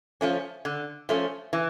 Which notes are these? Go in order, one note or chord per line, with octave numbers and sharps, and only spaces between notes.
F3 A3 C#4
D3
F3 A3 C#4
E3